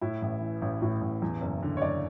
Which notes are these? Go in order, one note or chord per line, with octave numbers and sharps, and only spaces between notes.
A2 E4
A1
E3
A1
A2
A1
E2
F#1
D3
C#5
F#1 D5